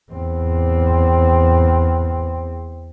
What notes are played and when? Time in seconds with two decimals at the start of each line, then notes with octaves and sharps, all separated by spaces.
0.12 E2 C4